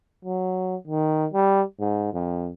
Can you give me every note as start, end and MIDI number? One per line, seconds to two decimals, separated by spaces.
0.25 0.76 54
0.87 1.26 51
1.33 1.62 55
1.80 2.13 44
2.13 2.50 41